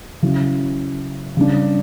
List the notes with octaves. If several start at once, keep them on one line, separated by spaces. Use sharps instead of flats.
C#3 F#3 C#4 E4
C#3 G3 D4